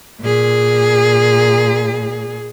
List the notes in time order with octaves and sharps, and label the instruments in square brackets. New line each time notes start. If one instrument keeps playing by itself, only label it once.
[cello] A#2 G#4